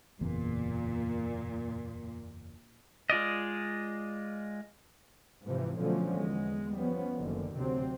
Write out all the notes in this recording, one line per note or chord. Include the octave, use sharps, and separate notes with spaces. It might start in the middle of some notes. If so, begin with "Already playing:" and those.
F#1 E2 A#2
G#3 F4 D5 D#5
G#2 C3 E3 F3
B2 D3 F3 F#3 A3 C#4
E2 G#3
F3 G3 B3 C#4
F#1 D3 D#3
D2 C3 F#3 C4